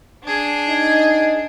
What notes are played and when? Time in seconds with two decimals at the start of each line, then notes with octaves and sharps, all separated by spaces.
0.24 D4 G#4
0.69 D#4